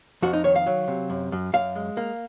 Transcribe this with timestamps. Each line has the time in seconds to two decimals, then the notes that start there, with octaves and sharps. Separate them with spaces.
0.22 F2 F#4
0.33 D#4
0.44 D#3 C#5
0.56 F5
0.66 F#3
0.88 C3
1.10 F#2
1.32 F#2
1.53 F#2 F5
1.75 G#3
1.97 A#3